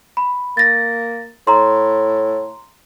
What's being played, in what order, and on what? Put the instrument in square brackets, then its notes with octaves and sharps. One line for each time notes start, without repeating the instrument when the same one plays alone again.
[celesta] B5
[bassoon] A#3 [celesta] A6 A#6
[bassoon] A2 [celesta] A#5 C6